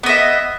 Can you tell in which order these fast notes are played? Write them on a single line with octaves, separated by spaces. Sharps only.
B3 D#5 E5